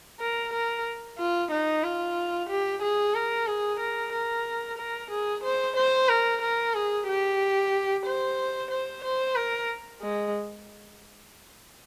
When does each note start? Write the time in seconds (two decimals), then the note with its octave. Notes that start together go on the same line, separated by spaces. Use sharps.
0.20 A#4
0.53 A#4
1.18 F4
1.51 D#4
1.84 F4
2.49 G4
2.82 G#4
3.15 A#4
3.47 G#4
3.80 A#4
4.13 A#4
4.78 A#4
5.11 G#4
5.44 C5
5.76 C5
6.09 A#4
6.42 A#4
6.74 G#4
7.08 G4
8.06 C5
8.71 C5
9.04 C5
9.36 A#4
10.02 G#3